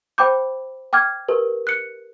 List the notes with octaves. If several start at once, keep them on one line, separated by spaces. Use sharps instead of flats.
C5 G5 B5 D6 G6
G5 D6 F6 G#6
G4 A#4 B4
F#6 C#7